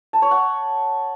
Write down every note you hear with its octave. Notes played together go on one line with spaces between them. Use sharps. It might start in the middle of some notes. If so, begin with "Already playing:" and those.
A5
C#5
F#5